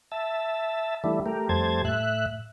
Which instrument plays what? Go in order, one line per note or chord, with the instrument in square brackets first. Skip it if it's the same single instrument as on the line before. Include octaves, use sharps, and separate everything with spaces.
[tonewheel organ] E5 A5
E3 G3 A3 D4 E4
A3 G4 A#4
F2 G3 A3 C5 A5 G#6
A2 E5 F#6